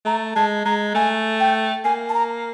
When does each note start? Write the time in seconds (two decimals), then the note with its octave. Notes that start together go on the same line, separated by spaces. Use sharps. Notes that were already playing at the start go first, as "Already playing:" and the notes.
0.05 A3 A#5
0.36 G#3 A5
0.65 G#3 A#5
0.94 A3 G#5
1.40 G5
1.84 A#3 G#5
2.09 A5
2.14 A#5